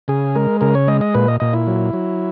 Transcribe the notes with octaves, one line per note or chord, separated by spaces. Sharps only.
C#3 G#4
G#3 A#4
C#3 A#4
C#5
G#3 D#5
D#5
A#2 B4
D#5
A#2 D#5
E4
F#3
F#3